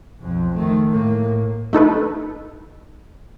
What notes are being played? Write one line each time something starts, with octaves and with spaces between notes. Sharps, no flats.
B1 F2
D#3 A3
A2 A#3
A3 D#4 A4 B4